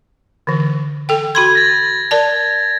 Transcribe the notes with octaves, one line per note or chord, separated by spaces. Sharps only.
D3 E3
A4 G5
F#4 B5 C6 G#6
A6 A#6
A#4 D5 A5